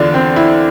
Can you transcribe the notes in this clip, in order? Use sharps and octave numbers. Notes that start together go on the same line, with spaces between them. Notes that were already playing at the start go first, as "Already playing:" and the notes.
Already playing: E2 D3 D4 F4
C4
E4